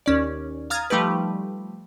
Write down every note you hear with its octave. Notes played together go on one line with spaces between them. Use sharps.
D#2 C#4 D5
F5 A#5 D#6 F6 G#6 A6
F3 G3 A3 D#4 G4 B4